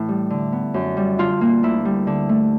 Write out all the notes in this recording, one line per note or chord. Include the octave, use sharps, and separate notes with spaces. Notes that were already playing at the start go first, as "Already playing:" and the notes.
Already playing: A2 E3 E4
G3
D3
B3
F#2
G3
D3 F4
A#3
D2 E4
G3
D3
A3